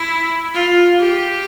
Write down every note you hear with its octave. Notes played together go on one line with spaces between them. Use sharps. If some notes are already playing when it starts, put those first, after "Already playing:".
Already playing: E4
F4
G4